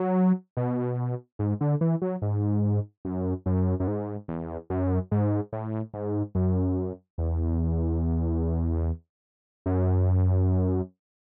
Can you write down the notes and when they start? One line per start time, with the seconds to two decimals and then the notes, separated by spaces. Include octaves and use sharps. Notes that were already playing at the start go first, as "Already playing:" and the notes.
Already playing: F#3
0.57 B2
1.39 G#2
1.61 D3
1.81 E3
2.02 F#3
2.22 G#2
3.05 F#2
3.46 F#2
3.80 F#2
3.87 G#2
4.28 E2
4.70 F#2
5.12 G#2
5.53 A2
5.94 G#2
6.35 F#2
7.18 E2
9.66 F#2